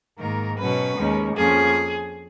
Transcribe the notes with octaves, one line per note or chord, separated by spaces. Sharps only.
G#2 D#3 A#3 A#4
B2 F#3 C#4 B4
D#2 D#3 G#3 C#4
F2 F3 A#3 C#4 G#4